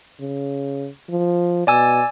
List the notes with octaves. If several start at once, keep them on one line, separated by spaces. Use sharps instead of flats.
C#3
F3
B2 D5 G#5 E6